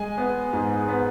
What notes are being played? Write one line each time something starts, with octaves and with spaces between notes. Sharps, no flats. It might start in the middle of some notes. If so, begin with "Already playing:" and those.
Already playing: G#3 G#5
B3
G#2
B3